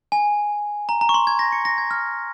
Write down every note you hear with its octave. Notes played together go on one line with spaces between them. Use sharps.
G#5
A#5
A#5
C#6
C6
G#6
A#6
C#7
A#6
G#6
F6